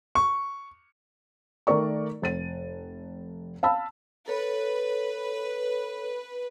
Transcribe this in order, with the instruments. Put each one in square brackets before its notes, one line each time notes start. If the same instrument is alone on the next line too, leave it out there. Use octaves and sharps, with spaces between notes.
[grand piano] C#6
[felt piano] D#3 A3 A#4 D5 C#6
F1 A6 D#7
F5 A5 B5 E6
[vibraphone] A4 C#5 [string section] B4